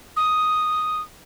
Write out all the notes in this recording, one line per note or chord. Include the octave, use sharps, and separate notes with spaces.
D#6